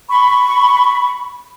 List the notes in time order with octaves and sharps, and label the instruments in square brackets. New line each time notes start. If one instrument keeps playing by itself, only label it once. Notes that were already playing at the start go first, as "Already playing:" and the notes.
[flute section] B5 C#6